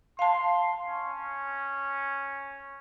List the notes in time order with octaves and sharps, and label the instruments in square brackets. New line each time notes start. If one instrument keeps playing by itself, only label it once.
[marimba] F5 A5 [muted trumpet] C6
[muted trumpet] C#4